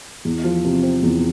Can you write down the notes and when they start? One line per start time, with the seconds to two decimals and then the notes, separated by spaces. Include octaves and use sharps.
0.25 E2
0.44 F3
0.65 C3
0.83 C4
1.03 E2